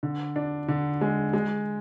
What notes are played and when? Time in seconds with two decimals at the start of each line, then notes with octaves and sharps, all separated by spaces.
0.03 D3
0.36 D4
0.68 D3
1.01 G#3
1.33 G#3